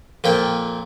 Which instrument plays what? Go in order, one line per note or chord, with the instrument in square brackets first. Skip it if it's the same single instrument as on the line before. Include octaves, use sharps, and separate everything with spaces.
[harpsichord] F2 A#2 G5